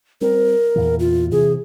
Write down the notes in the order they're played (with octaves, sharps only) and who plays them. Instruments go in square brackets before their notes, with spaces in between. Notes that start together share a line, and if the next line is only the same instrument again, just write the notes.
[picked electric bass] G3 C4 [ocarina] A#4
[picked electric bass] E2 A#2 E3
[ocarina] F4
[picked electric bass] C3 E3 [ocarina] G#4